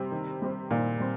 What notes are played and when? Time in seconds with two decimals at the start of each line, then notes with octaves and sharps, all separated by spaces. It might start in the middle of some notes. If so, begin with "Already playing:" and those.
Already playing: C3 G3 C4 G4 C5
0.12 D#3
0.42 G3 C4 G4 C5
0.71 A#2 D#3
1.00 G3 C4